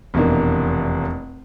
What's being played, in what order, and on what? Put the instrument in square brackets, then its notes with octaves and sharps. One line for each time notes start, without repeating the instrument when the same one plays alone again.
[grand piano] F1 E2 B2 A#3 D4